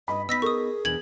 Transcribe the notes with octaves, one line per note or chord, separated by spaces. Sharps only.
G2 D#5 B5
B3 D#4 D#5 E6 A#6 B6
G#4 A#4 C#6 D#6
E2 B2 D4 G#6 F#7